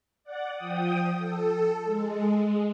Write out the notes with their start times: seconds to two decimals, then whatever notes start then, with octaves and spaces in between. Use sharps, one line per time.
0.24 D5 F#5
0.55 F3 G5 D#6
1.18 A4
1.84 G#3